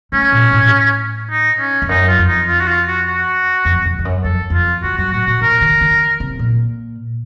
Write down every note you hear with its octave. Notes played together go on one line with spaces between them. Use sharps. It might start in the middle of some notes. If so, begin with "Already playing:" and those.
A3 C#4
A#2
A2
D#4
C#4
F2
F#2 D#4
F4
F2
D#4
F4
F#4
F4
F#4
F#4
F2
F2
F2
F#2
F2 A4
F2 F4
F2 F#4
F#2 F#4
A2 F#4
A#2 F#4
C3 A#4
D#3
D#3
C3
A#2